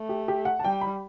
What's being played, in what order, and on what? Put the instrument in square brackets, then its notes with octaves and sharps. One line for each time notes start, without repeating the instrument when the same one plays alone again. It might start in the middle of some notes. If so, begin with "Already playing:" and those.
Already playing: [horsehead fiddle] A3
[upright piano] G4
G4
F#5
A5
[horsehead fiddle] G3 [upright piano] G5
[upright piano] B5